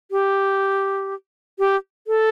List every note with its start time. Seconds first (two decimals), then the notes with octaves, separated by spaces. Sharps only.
0.11 G4
1.59 G4
2.07 A4